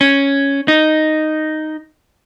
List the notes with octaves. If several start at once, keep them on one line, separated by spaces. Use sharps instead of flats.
C#4
D#4